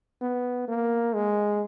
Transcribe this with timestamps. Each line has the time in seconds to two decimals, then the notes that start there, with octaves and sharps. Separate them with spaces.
0.21 B3
0.68 A#3
1.14 G#3